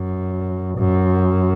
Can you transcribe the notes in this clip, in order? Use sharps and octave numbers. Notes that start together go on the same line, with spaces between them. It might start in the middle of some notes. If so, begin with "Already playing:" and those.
Already playing: F#2
F#2